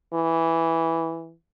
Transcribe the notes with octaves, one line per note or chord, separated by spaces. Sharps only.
E3